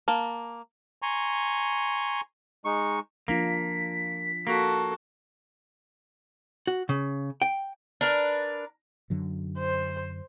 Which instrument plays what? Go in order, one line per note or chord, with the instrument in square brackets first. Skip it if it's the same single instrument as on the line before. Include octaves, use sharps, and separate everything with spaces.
[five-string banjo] A#3 A5
[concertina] G#5 A#5 C6 C#6
G#3 D#4 C#6
[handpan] F3 D4 F4 [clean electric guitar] A#3 [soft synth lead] B6
[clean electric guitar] A#3 [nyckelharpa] F#4 A4
[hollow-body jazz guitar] F#4
C#3
G5
[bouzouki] D4 A#4 B4
[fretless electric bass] F#2 D3 F#3
[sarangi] C5